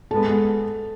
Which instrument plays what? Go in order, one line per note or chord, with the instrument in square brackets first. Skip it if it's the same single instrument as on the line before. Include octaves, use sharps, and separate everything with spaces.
[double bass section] G#2 G#3 B3 [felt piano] A4 A5